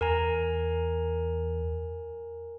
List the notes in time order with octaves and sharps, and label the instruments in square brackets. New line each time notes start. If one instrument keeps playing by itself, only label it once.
[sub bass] E2 [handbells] A#4 G#5 A#5